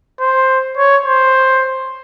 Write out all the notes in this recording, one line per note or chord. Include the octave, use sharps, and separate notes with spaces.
C5
C#5
C5